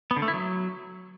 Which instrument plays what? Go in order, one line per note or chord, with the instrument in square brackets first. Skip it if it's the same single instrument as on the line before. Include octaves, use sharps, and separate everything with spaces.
[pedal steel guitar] B3
D3
A3
E4
F#3